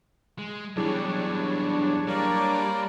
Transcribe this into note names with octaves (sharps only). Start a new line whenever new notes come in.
G#3
E2 F#3 G3 D4 E4 G#4 C#5
G3 A#3 A#4 D5